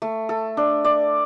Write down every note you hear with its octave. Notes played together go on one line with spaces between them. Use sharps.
A3
A4
D4
D5